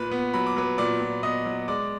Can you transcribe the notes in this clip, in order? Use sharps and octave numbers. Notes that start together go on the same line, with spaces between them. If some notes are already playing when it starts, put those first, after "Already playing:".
Already playing: A#2 B4 B5
B3
F#3 B5
D6
F#3 B4 B5
A#2 D5 D6
A#2
B3 D#5 D#6
F#3
G#3 D5 D6